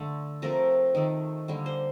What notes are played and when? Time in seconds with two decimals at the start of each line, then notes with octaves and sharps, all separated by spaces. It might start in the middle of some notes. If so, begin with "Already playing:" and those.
Already playing: D3 A3
0.42 C3 F3 A3 A#4
0.95 D#3 A3
1.48 D3 G3 A#3
1.66 C5